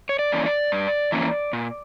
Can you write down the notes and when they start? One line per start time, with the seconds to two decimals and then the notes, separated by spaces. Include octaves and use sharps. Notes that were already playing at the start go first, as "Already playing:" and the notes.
0.09 C#5
0.19 D5
0.32 E3 A#3 C#4
0.46 D5
0.72 G2
1.12 E3 A#3 C#4
1.53 A#2